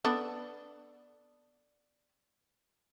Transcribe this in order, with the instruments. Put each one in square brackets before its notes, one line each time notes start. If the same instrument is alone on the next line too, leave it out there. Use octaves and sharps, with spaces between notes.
[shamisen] B3 D4 A4